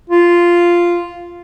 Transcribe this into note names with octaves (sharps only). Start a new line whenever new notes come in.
F4